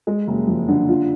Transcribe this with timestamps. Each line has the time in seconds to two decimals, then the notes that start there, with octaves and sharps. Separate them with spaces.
0.07 G#3
0.27 F#1
0.47 F2
0.68 D3
0.89 F4